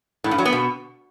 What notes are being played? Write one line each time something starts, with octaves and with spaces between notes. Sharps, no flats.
A2
G2
F#3
B3
B2